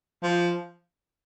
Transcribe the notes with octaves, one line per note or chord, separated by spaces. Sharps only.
F3